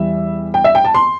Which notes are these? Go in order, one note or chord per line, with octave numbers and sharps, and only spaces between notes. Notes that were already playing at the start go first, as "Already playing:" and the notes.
Already playing: E2 E3 G3 E5
G5
E5
G5
A5
C6